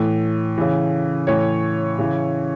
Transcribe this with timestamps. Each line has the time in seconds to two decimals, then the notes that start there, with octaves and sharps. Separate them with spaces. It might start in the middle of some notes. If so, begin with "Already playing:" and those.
Already playing: A2 E3
0.58 C#3 E3
1.27 A2 E3 C#5
1.98 C#3 E3